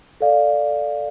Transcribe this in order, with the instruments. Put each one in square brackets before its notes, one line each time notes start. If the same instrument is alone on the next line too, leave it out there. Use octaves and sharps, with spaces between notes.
[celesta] A4 D5 F5